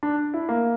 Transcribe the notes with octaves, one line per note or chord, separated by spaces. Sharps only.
D4
E4
A#3